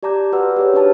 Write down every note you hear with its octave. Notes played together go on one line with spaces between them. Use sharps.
G4 D5 A5 A#5 D6 G6
F#4 B4 D5 F#5 E6
G4 G#4 C#5
D4 D#4 G4 B4 C#5 A5